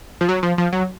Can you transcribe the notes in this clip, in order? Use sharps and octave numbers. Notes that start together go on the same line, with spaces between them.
F3
F#3
F3
F3
F#3